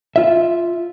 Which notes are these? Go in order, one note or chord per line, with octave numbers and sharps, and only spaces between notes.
F4 E5